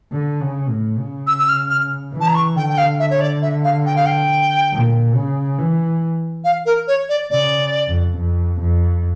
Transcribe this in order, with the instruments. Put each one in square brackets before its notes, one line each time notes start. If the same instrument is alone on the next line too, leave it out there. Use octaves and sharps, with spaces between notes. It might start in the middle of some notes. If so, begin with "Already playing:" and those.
[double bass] D3
C#3
A2
C#3
[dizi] E6
E6
F6
F6
[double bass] E3
[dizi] A5
A#5
C#6
[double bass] D3 [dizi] G5
[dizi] G5
F5
E5
C#5
D5
E5
F5
G5
F5
G5
[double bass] A#2
C#3
E3
[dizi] F5
A#4
C#5
D5
[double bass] C#3 [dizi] D5
[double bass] F2
F2
F2